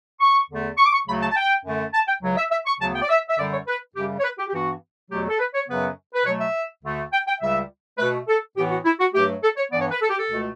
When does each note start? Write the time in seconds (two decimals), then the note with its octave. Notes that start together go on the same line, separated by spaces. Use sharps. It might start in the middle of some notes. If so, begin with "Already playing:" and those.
0.20 C#6
0.49 E2 D3 A3
0.78 C#6
0.86 D6
0.93 C#6
1.06 D2 C#3 F#3 A3 B5
1.21 A5
1.32 A5
1.36 G5
1.64 F#2 D3 A3
1.94 A5
2.07 G5
2.22 C#2 C#3 F#3
2.37 E5
2.51 E5
2.66 C#6
2.80 D2 C#3 F#3 B3 A5
2.95 G5
3.02 D5
3.09 E5
3.29 E5
3.38 F#2 D3 G3 D5
3.52 C#5
3.67 B4
3.95 F#2 C#3 G3 G4
4.19 C#5
4.23 B4
4.38 G4
4.49 G4
4.53 G2 E3 B3 F#4
5.10 E2 B2 F#3 A3 G4
5.29 A4
5.40 B4
5.54 C#5
5.68 F#2 C#3 F#3 B3 B4
6.14 B4
6.26 B2 F#3 A3 C#5
6.40 E5
6.83 D2 D3 A3
7.12 G5
7.27 G5
7.41 C#2 C#3 G3 E5
7.98 B2 A3 B4
8.28 A4
8.56 A2 E3 B3 G4
8.71 F#4
8.85 E4
9.00 F#4
9.14 G2 F#3 A3 G4
9.43 A4
9.57 C#5
9.72 G2 E3 B3 D5
9.81 C#5
9.91 B4
10.01 A4
10.10 G4
10.17 A4
10.30 C#2 B2 A3